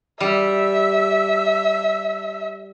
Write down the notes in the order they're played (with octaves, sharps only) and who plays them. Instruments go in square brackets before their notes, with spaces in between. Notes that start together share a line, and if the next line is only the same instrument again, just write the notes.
[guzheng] G3 [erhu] E5